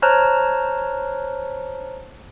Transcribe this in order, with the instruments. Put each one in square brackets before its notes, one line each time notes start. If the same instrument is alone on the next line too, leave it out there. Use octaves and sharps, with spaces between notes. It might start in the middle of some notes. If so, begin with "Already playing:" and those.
[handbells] C5 C#5 A5 A#5 F6 F#6